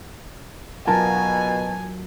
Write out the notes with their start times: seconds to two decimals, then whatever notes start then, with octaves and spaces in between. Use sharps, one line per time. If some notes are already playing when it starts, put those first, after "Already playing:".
0.87 B2 F#3 F4 A#4 G#5 A5